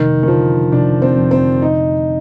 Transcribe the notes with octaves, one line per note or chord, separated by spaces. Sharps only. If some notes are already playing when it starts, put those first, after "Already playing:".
Already playing: F1 D#3
D#3
D3 F3
F1 D4
C4
F2
C4
D#4